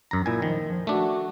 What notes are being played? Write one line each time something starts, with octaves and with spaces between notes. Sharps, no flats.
F#2 A#5
A#2 E4 G#5
D#3 F3
F3
A3 D4 F#4